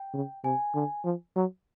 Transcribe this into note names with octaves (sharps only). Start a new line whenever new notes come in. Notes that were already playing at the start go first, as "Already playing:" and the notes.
Already playing: G5
C#3
C3 G#5
D3
F3
F#3